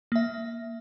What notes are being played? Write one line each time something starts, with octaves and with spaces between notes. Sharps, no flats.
A#3 E5